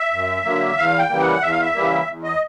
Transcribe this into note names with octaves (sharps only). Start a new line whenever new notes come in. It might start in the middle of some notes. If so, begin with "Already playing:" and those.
Already playing: E5
F#2
D3 F#3 A#3
E2 F5
G5
C#3 E3 G3 A#3
F#5
E2 E5
F5
E5
C#3 E3 G3 A#3
E2
D#5